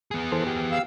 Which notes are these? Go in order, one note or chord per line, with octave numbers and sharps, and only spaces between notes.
B3 G#4
E3 A4 C5
G4
F5 E6